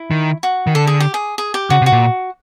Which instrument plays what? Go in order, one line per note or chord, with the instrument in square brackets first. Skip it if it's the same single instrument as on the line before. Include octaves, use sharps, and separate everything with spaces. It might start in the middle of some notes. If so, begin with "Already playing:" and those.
Already playing: [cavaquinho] E4
[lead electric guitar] D#3
[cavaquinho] F#4
[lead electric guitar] D#3
[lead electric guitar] D3 [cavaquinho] A4
[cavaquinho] G#4
G4
G#4
G#4
G4
[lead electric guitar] C#3 [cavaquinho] F#4
[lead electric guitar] C3
[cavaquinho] F#4
[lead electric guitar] A#2